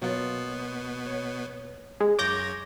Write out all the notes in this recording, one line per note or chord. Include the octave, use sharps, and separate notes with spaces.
B2 F#3 A#3 B3 F4
C#5
G#3
F#2 F4 C#5 D6 G6 A#6